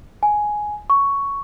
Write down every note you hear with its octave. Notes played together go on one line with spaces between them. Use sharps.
G#5
C#6